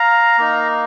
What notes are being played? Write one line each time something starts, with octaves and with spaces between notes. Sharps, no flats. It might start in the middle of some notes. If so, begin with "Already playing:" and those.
Already playing: F5 A#5
A#3 D#4